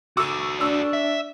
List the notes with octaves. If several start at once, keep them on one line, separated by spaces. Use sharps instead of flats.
F#4 A4 C#6 D6 E6
D4 C#6 E6
E5